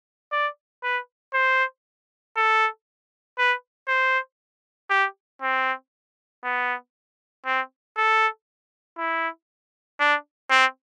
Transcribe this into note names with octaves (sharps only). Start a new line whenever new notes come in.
D5
B4
C5
A4
B4
C5
G4
C4
B3
C4
A4
E4
D4
C4